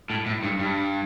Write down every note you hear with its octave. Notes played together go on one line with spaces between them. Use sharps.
A2
A2
G2
G2